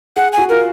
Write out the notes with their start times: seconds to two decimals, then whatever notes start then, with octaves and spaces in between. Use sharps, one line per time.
0.17 G#4 F#5
0.33 G#5
0.38 F#4
0.49 F4 A#4